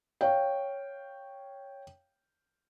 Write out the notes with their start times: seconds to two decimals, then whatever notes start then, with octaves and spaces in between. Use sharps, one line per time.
0.21 C#5 F5 G5